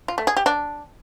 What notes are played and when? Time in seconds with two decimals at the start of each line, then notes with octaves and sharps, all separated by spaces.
0.08 F4
0.18 A3
0.27 G#4
0.37 G4
0.46 D4